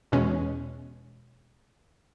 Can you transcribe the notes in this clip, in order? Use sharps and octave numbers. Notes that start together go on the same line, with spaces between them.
E2 B2 G#3 C#4